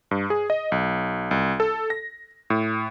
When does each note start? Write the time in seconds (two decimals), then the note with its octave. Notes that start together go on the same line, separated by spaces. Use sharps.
0.11 G2
0.30 G#4
0.50 D#5
0.72 B1
1.31 C2
1.60 A4
1.90 A#6
2.50 A2